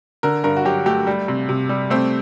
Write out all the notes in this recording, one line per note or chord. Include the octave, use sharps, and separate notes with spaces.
D3 A#4
G2 A#4
F#4
F#3 G4
A3 G4
G3
C3
C3
G3
A3 C4